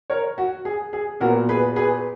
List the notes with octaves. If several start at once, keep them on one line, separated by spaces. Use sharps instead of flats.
A#4 C#5
F#4
G#4
G#4
A#2 F#3 B3 F#4 A#4
G#4 B4
G#4 B4